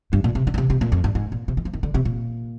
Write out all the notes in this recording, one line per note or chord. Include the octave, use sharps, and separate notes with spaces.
G2
A#2
C3
D3
A#2
C3
C3
A#2
F2
G2
G#2
A#2
C3
D#3
F3
D#3
D3
C3
A#2